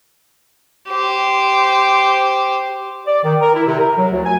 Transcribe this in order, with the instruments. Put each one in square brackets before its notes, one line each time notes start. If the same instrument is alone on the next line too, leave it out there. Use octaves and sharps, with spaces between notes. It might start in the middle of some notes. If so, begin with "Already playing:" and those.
[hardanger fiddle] G4 C5
[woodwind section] D5
D#3
A#4
E4
C3
A#4
F#3
D2
G#5